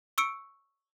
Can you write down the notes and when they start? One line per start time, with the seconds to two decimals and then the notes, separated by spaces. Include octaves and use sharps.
0.18 C#6 E6 C#7 D7